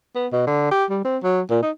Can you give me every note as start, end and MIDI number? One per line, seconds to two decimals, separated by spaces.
0.15 0.27 59
0.32 0.47 47
0.47 0.69 50
0.71 0.85 67
0.90 1.00 55
1.05 1.18 60
1.23 1.41 54
1.51 1.60 46
1.63 1.71 63